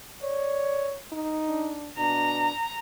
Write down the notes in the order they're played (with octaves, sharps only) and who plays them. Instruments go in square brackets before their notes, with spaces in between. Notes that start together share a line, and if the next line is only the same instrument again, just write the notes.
[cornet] C#5 [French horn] D5
[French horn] D#4
[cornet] D4
[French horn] B2 [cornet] D4 [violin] A#5